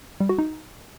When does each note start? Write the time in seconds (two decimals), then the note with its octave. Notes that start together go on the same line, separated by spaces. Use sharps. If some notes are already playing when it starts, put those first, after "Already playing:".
0.20 G3
0.29 F#4
0.38 D#4